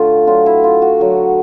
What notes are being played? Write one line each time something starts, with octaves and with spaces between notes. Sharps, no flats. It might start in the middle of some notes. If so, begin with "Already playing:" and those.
Already playing: D3 A3 F4
D3 F#3 A3 F4
E4
F4
F#4
D3 F#3 A3